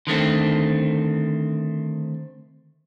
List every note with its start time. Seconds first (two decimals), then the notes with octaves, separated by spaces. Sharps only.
0.07 D3 D#3 A3 C4